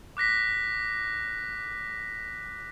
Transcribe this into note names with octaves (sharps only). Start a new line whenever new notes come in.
D6 F#6 A#6 B6